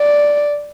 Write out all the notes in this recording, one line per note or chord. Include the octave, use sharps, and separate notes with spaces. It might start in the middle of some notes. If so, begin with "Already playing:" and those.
Already playing: D5